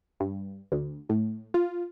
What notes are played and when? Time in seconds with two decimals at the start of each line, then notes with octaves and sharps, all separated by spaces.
0.20 G2
0.72 D2
1.09 A2
1.54 F4